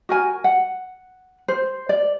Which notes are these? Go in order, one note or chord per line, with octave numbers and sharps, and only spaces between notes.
F#4 A#4 G#5
F#5
C5
D5